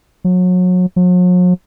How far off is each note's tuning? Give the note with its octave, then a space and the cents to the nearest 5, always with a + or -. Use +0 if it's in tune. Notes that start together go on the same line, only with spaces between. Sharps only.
F#3 -30
F#3 -45